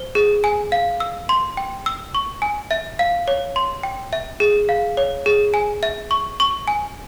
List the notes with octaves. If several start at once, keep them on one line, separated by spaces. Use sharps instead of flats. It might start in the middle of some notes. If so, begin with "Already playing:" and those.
Already playing: C5
G#4
G#5
F5
E6
C6
G5
E6
C#6
G#5
E5
F5
C#5
C6
G5
E5
G#4
F5
C#5
G#4
G#5
E5
C#6
C#6
G#5